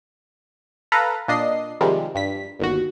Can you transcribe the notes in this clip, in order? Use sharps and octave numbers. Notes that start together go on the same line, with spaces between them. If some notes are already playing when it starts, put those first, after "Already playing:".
A4 B4 F5 A#5
A#2 D4 D#5 C7
C3 D#3 F3 G3 G#3
G2 B6
G1 D#2 F#4